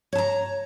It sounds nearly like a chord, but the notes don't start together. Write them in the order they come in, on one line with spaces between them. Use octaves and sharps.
C#5 A5 A#5